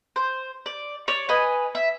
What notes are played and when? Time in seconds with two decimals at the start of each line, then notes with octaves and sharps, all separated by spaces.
0.16 C5
0.66 D5
1.08 C#5 D5
1.29 B4 D#5 G#5
1.75 E5